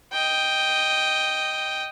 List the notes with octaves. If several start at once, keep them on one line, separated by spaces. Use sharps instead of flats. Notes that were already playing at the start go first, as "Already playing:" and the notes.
D#5 G5